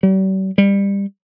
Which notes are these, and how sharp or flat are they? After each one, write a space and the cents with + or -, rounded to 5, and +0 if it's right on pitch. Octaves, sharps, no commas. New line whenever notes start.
G3 -45
G3 +25